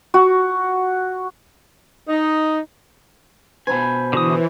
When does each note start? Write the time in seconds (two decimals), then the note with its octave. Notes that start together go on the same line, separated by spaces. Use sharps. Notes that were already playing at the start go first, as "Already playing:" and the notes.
0.14 F#4
2.08 D#4
3.67 B2 C5 G#5 B5
4.13 D3 E3 F#4 D#6